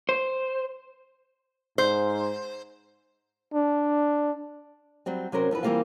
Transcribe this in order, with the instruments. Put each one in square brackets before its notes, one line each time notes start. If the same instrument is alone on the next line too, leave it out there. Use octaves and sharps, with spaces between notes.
[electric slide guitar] C5
[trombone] G#2 [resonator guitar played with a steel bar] C5
[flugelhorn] D4
[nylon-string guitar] F#3 G3 C4
C3 F#3 C#4 A#4 C5
E2 F3 D4 B4
E3 G3 G#3 A#3 C4 F4